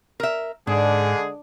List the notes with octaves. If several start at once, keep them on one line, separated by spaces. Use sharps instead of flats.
A#4 E5
G#2 D3 G#3 D4 G#4